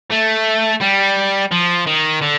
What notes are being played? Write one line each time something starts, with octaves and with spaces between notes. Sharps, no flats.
A3
G3
F3
D#3
D3